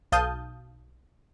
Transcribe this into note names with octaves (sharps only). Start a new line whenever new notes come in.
B1 F5 A5 D#6 G6